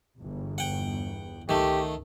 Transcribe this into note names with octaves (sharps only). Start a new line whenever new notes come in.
G1 E2
F#5 G5
C#2 D#3 A3 G4